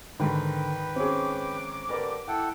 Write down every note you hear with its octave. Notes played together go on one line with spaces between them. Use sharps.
G#2 D3 D#3 B4 G5 B5
C4 C#4 G#4 D6
D3 G4 A#4 B4 D5
E4 A4 F#5 G5